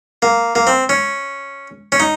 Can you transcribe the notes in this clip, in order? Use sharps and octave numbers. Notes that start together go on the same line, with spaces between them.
A#3
A#3
C4
C#4
C#4
D#4